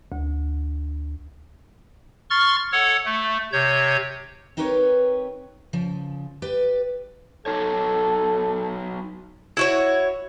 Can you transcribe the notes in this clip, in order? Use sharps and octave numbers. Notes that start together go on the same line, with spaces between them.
D2
C6 C#6 F6 A6
A4 C#5 F#5
A3
C3 C#5 G6
C4 D#4 G4 A#4 B4 C#5
C#3 F3
G4 B4 D5
F#3 D#4 A4 C#5
E4 F#4 C#5